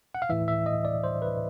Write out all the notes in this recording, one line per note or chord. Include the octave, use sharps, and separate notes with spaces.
F#5
F5
A2 E3 E5
E5
D#5
D5
C5
B4